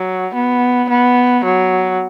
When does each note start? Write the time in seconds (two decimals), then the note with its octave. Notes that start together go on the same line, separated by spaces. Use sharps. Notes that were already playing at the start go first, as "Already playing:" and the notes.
Already playing: F#3
0.34 B3
0.90 B3
1.45 F#3